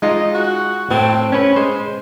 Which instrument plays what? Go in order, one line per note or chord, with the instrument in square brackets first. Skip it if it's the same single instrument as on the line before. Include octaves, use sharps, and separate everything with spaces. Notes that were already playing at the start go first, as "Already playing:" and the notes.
[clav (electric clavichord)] G#3 D#4 F4 [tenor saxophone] D#5
[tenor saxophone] F#4
[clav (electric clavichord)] A2 [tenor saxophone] C4
[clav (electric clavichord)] C#4 B4 [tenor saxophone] C#5
[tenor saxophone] G#3 [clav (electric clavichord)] C5